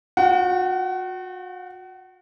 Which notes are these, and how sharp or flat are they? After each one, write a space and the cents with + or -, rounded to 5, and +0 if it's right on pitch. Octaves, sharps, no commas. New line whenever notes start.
F#4 -35 F#5 +35